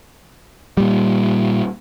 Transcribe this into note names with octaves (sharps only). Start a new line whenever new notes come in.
A#2 G3